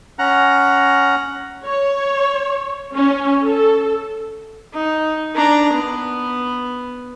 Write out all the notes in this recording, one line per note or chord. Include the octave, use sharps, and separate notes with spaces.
C#4 F#5 A#5
C#5
C#4
A4
D#4
D4 A#5
B3